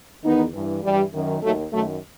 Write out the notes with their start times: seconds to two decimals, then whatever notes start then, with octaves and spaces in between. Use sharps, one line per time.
0.24 E2 D#3 B3 D#4
0.53 G2 E3
0.83 G2 E3 G3
1.13 F#2 D#3
1.43 D#2 D#3 F#3 A3
1.73 F#2 D#3 F#3 A3